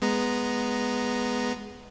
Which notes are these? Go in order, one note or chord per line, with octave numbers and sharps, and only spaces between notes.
G#3 B3 A#5